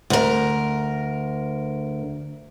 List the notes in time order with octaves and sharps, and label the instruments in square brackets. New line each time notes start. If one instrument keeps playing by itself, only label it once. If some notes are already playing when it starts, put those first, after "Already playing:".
[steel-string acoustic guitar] D2 A#4